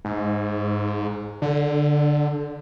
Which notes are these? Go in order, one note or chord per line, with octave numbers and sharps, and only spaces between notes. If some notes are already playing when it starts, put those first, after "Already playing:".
G#2
D3